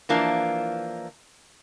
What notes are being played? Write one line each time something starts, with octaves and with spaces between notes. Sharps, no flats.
E3 F3 A#3 D4